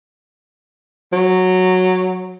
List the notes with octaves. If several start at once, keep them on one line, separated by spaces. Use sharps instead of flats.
F#3